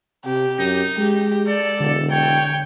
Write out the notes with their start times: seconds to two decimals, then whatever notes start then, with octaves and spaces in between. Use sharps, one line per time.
0.25 C3 G4
0.59 F#2 D#4
0.98 G#3 G4
1.47 A4 D5
1.80 E1 D3
2.11 C#5 G5